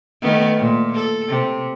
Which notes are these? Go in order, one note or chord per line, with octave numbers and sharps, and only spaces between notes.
D#3 A3 B3
A#2
A4
C3